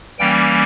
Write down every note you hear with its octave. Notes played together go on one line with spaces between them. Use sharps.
E3 G3 A#3 C#4 G5